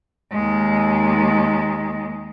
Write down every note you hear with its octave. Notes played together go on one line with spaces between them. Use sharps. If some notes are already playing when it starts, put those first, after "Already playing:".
D#2 G#3